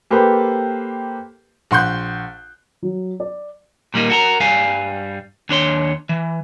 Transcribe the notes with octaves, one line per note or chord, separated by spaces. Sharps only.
A#3 G4 A4 B4 C5 G5
A#1 F#5 C6 F#6 G6
F#3
D5
A#2 G3 A#3 D#4
F#4 A4 A#4
G2 G3 F5 G#5
D#2 D4 C#5 C6
E3